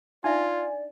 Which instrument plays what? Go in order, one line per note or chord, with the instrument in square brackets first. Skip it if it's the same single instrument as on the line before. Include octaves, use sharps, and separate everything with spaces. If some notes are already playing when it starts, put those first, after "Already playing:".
[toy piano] D4 D#4 E5 [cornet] F4 [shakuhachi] D5 [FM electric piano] G#5